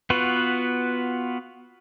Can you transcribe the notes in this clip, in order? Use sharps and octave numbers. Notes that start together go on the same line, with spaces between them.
B3 F4 F#4 B4